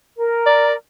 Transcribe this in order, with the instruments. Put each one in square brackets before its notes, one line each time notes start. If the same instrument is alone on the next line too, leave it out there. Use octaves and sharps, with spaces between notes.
[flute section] A#4
[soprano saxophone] D5